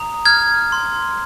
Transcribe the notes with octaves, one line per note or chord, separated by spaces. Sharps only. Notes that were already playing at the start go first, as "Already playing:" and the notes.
Already playing: A#5 D#6
F6 G#6
C6